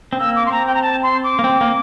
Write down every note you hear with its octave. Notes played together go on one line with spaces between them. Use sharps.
C4
A#3 E6
D6
C6
C4 A#5
G5
A#5
A5
C6
D6
A#3
C4
A#3